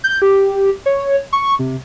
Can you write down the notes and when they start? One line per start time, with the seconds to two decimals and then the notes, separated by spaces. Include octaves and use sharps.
0.04 G6
0.22 G4
0.86 C#5
1.33 C#6
1.59 C3